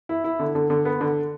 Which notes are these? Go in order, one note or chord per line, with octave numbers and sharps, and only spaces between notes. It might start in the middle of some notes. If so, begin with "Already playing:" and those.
E4
E4
D3
D3
D3
B3
D3